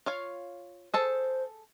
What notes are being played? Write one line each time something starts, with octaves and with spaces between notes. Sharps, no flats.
F4 C#5 F5
G#4 A4 C5 A5